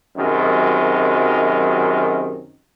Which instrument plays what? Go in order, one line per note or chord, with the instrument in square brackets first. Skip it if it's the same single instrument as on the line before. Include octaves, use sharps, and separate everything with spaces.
[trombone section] F#2 C3 D#3 F#3 G#3